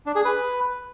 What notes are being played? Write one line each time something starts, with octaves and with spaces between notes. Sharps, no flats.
D4
G#4
B4